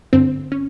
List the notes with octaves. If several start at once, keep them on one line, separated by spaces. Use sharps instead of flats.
G2 D3 C4
C#4